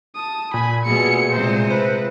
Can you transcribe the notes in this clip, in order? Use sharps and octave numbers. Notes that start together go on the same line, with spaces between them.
A5 D#6
A#2 G#5 B5
B2 A3 G#4 C#7
C3 G#3 C5
F4 B4 C5